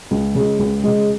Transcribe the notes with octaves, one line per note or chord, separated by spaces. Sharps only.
C#2
C#3
G#3
C#2
C#3 G#3